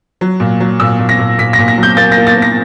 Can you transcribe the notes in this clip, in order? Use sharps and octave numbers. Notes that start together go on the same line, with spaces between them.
F#3
A#2
F#3
A#2 E6
A#2
A#6
A#2
A#2 B6
A#6
A#2
A#6
F#3
G6
A#3 A6
A#6
A#3
A6
A#3
A#6